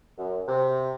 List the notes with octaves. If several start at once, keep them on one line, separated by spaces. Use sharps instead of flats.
F#2
C3